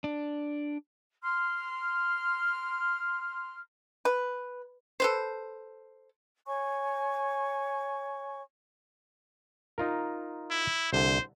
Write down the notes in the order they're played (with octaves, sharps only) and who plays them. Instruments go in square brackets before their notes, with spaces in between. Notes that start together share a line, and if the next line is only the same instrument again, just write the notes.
[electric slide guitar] D4
[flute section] C6 F6
[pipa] B4
A4 B4 C5
[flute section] C#5 G#5 C#6
[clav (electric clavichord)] D#4 F4 A#4
[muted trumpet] E4
[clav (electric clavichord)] C2 D3 [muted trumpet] C5